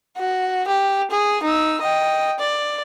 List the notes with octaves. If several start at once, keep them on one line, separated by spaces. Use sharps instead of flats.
F#4
G4
G#4
D#4 E6
D#5 G5
D5